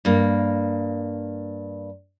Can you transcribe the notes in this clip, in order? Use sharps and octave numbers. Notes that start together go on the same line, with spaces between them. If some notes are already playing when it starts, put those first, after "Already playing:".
G2 A#3